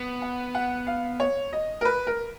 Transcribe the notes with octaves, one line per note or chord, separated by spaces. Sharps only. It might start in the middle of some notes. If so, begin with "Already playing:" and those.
Already playing: B3
F#5
F#5
F5
C#5
D#5
A#4
B4
A#4